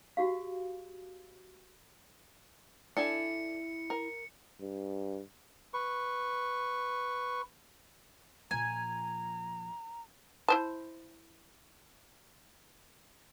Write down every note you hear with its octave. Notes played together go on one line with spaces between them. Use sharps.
F#4 G4 F5
D4 E4 A4 G#5 C#7
A#4
G2
B4 C#6
A#2 F3 G#5 A#5
E4 C5 A5